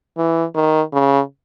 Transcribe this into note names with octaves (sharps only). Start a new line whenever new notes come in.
E3
D#3
C#3